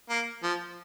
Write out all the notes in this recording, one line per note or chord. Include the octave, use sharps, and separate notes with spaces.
A#3
F3